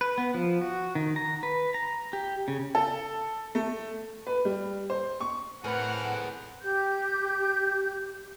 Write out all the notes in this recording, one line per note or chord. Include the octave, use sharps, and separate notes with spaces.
B4
B3
F3
F#4
D#3
A#5
B4
A#5
G4
C#3
A4
A3
B4
G3
C5
C#6
A2 E3 C4 C#4 G#4 A#4 B4 F#5
G4 G6